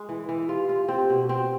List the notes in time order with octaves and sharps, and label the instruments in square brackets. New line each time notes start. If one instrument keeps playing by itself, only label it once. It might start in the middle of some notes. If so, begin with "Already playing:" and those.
Already playing: [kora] G#3
[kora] E3 [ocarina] E4
[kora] E3
[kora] F4 [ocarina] G4
[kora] F4
[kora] C4 [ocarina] G4
[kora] B2
[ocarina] F#4
[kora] C4 [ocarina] G4